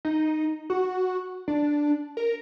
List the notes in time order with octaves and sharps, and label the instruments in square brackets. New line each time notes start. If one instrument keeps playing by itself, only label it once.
[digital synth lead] D#4
F#4
D4
A#4